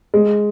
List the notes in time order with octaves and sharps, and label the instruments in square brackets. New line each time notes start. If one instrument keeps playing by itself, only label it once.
[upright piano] G#3